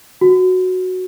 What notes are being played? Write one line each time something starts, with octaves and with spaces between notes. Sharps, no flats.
F#4